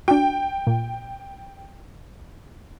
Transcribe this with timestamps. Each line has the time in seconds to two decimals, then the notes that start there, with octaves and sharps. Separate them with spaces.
0.08 D4 F#4 G5
0.67 A#2